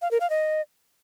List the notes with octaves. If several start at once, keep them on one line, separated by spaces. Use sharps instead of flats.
F5
A#4
F5
D#5